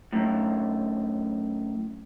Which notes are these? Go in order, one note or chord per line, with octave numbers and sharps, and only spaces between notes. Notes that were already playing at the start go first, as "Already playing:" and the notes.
F#2 A2